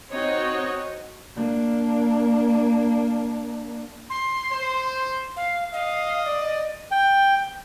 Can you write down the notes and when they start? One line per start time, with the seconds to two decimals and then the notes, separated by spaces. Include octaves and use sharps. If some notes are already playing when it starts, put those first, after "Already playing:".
0.10 C4 D#4 F#4 C#5 D#5
1.36 A#3 D4
4.10 C6
4.51 C5
5.37 F5
5.73 D#5 F5
6.25 D5
6.91 G5